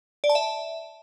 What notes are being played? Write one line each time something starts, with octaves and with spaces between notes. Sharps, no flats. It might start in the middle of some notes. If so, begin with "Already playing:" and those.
D5
A5
E5